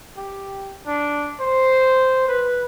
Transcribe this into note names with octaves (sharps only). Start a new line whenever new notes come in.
G4
D4
C5
B4